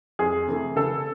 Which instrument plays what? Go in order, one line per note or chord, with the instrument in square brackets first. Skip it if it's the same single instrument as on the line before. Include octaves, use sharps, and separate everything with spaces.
[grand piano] F2 [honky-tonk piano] G#4
[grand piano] C3 E3 A3
[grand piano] C#3 [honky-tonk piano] A4